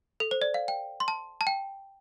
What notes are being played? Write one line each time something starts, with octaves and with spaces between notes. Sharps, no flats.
A4
C5
D5
F5
G5
C6
A5
A5
G5